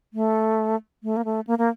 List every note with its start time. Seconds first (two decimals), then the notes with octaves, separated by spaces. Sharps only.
0.14 A3
1.03 A3
1.17 A#3
1.25 A3
1.47 A#3
1.58 A#3